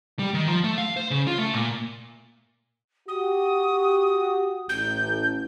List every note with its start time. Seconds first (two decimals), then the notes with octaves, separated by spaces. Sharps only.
0.19 G3
0.34 D#3
0.48 F3
0.64 A3
0.78 F5
0.97 C5
1.11 C#3
1.27 F4
1.38 A3
1.54 A#2
3.08 F#4 G4 D#6
4.69 A1 G6